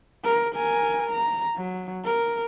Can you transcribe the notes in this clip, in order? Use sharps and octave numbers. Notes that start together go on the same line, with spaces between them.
A#4
A#4 G#5
A#5
F#3
A#4